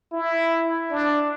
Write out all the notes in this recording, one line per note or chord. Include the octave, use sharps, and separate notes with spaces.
E4
D4